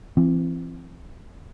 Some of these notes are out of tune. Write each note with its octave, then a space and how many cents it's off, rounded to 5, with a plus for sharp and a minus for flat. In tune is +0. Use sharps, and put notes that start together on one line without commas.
E3 +40 C4 +0